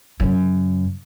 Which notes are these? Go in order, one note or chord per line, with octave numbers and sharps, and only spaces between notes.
F#2 C#3